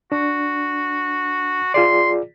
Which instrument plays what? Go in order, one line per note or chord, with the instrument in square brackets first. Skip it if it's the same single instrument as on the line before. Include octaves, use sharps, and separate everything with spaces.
[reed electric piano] D4 [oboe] F#4
[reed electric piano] F4 G#4 D5 [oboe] C6